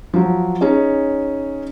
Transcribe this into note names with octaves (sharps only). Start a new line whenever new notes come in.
F3 F#3
C#4 D#4 G#4 C#5